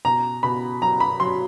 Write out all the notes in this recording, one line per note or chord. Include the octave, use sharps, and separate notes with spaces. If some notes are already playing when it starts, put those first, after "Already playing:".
B2 A#5
B2 B5
F#3 A#5
B5
F#3 C6